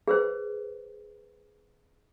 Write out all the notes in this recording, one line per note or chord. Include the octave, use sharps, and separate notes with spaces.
G#4 B4 C5